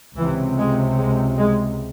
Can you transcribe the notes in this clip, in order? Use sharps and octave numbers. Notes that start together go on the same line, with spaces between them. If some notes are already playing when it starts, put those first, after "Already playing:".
C#2 C3 E3
G#3
G#3
G#3